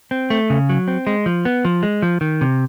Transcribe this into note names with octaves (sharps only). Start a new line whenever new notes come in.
C4
A3
C#3
F#3
C4
G#3
F3
B3
F3
G#3
F3
D#3
C3